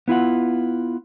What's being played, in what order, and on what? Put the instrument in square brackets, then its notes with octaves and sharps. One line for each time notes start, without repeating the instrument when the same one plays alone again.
[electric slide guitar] B3 E4 F4 F#5